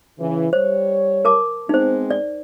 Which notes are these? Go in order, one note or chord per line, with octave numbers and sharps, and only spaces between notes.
C#3 E3
G3 C5 C#5
A#4 A5 D6
G#3 B3 C4 D#4 C5
D5